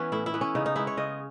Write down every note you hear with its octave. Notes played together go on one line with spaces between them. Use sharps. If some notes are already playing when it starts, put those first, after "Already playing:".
Already playing: E3 B3 C#4
A2 E4
E4
E3 B3
C#4
C#3 D#4
D#4
G#3 B3 E4
C#5
C#3 D#5